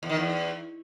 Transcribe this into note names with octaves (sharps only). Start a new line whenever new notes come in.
E2
D#3
E2